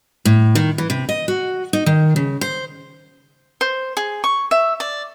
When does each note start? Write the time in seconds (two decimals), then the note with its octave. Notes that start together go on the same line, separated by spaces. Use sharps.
0.25 A2
0.55 D#3
0.78 E3
0.90 C3
1.09 D#5
1.28 F#4
1.73 D#4
1.86 D#3
2.16 C#3
2.41 C5
3.61 C5
3.97 G#4
4.24 C#6
4.51 E5
4.80 D5